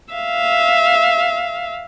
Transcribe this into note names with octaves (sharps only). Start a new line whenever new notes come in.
E5 F5